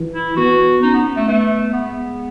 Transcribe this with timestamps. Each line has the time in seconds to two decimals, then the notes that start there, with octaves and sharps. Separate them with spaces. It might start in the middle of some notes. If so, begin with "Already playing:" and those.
Already playing: E3
0.14 E4
0.36 B3 F#4
0.82 C#4 D#4
0.94 B3
1.16 A3
1.28 A3 B3
1.73 G#3 B3